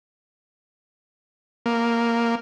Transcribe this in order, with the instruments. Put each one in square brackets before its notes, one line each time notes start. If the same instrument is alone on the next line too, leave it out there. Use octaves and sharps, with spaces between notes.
[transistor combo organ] A#3